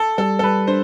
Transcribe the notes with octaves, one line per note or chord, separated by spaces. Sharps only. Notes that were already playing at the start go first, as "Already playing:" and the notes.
Already playing: A4
G3 A4
A4
G3 B4
D4 C5